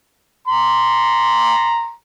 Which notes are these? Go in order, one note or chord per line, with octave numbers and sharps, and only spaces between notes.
A#5 C6